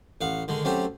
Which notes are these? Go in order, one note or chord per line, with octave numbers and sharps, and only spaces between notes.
A1 F5 F#5
D3 D#3 G#3
F#3 A3 C4 C#4 G4